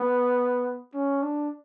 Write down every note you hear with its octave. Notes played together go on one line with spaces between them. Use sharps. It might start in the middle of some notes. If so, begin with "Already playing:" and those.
Already playing: B3
C#4
D4